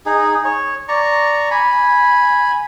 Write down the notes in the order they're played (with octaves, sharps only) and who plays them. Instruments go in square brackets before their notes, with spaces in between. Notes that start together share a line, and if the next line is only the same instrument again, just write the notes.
[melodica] D#4 G#4
C#5
D5 A#5 C#6
G#5 B5